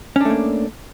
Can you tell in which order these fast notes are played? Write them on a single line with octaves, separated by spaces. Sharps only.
C#4 D4 A3 A#3